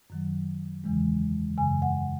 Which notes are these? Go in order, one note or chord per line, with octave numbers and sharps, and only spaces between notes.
F#2 D#3 F#3
E2 C#3 E3 G#3
F#2 C#3 E3 G#5
F#5